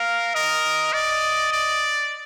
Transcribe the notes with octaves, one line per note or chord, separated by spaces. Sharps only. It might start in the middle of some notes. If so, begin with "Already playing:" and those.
Already playing: A#4 F5
A#4 D#5
D5 D#5
D5